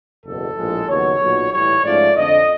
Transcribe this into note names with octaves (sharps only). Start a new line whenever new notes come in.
F#1 E2 B2 A4
A#1 A2 F3 G#3
D#2 C#3 F#3 B3 C#5
B1 A#2 F#3
A2 E3 G3 C#5
G#2 F3 A3 C#4 F4 D5
F2 D3 F3 D#5